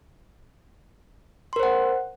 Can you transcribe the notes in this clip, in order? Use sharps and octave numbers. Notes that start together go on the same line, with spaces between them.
A#4 C5 F#5 C6